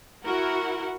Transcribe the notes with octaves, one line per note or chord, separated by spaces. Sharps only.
E4 F#4 A#4 F#5